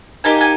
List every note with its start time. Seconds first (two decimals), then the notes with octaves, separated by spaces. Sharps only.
0.24 A#3 D#4 G4 G#5
0.41 G#5